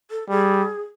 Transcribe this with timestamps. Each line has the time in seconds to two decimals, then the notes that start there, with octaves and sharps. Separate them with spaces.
0.11 A4
0.29 G3 G#4